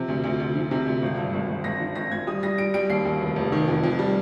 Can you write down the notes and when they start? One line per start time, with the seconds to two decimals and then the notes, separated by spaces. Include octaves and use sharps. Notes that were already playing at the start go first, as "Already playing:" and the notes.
Already playing: C3 F3
0.08 D2
0.24 D2
0.40 D2
0.55 F3
0.71 C3
0.87 D2
1.03 G#1
1.18 G2
1.34 G#1
1.49 G#1
1.64 G#1 A#6
1.80 F3
1.96 G#1 A#6
2.11 G#1 G#6
2.27 G3 D#6
2.43 G3 A#6
2.58 G3 D7
2.74 G3 D7
2.89 D#2 C7
3.05 D#2
3.21 F1
3.36 F1
3.52 D#3
3.68 F2
3.84 F2
3.99 G3